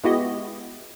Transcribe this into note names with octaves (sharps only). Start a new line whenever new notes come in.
G#3 B3 E4 F#4 G4 D#5